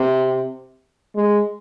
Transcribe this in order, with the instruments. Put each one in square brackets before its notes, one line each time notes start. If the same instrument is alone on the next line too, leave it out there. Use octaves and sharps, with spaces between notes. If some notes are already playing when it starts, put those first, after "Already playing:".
Already playing: [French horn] C3
G#3